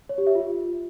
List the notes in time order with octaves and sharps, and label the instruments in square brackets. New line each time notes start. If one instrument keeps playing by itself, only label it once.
[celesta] C#5
G4
E5
F4